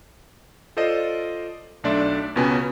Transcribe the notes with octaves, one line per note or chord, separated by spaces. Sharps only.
F4 A4 C5 D5 D#5
B1 A3 D4 D5 E5 C6
C#2 B2 B3 C#4 G#5